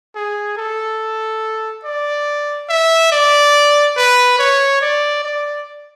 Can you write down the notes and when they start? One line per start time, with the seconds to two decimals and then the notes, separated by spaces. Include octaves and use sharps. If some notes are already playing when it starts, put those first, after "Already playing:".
0.15 G#4
0.57 A4
1.85 D5
2.69 E5
3.12 D5
3.97 B4
4.39 C#5
4.82 D5
5.24 D5